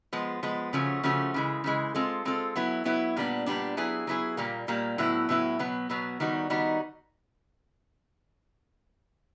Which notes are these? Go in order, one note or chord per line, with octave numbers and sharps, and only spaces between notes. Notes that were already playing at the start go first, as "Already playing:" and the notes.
F3 G#3 B3
F3 G#3 B3
C#3 F3 A3 C#4 F#4
C#3 F3 A3 C#4 F#4
C#3 E3 G#3
C#3 E3 G#3
G#3 C4 F4 A4
G#3 C4 F4 A4
F#3 B3 E4
F#3 B3 E4
A#2 G3 B3 D4
A#2 G3 B3 D4
F#3 B3 E4 G#4
F#3 B3 E4 G#4
A#2 G3 A#3
A#2 G3 A#3
A2 F#3 B3 E4
A2 F#3 B3 E4
B2 F#3 B3
B2 F#3 B3
D#3 G3 B3 D#4 F#4
D#3 G3 B3 D#4 F#4